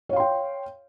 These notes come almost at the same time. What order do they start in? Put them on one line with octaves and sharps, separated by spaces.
C#5 F5 C6 G5